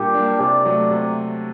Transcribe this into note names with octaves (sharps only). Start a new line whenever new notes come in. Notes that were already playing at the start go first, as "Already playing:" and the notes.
Already playing: A#2 G3 A#3 D4 G4
G3 A#3 D4
C3 D5
F#3 A3
C3